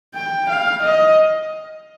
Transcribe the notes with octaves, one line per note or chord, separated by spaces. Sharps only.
G5
F5
D#5